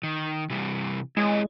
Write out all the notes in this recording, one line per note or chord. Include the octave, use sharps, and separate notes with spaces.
D#3
C3 E3 G3
G#3 E4 C#5 D#5